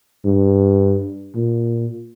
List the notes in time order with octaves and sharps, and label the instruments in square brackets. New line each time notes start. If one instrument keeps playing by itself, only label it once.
[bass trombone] G2
A#2